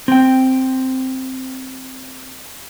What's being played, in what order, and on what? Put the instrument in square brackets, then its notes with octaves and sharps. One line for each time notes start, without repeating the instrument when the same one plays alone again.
[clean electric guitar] C4 G5